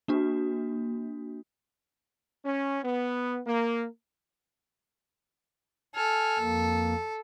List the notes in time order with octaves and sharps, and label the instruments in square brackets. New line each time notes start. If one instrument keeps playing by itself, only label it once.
[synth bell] A#3 D4 F#4
[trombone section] C#4
B3
A#3
[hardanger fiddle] A4 [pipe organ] G#5 F6
[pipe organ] F2 A#3